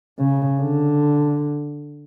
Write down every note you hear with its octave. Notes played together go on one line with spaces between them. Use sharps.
C#3
D3